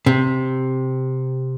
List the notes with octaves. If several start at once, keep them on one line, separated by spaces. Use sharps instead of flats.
C3